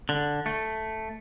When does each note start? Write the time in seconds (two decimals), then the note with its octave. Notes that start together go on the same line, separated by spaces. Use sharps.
0.09 D3
0.46 A3